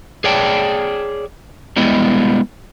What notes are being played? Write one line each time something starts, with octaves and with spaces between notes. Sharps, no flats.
G#4 C#5 D5 G5 A5
G3 G#3 B3 E4 D#5